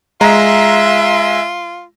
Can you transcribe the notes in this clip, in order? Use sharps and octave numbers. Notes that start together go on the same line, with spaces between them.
G#3 F4 E5 A#5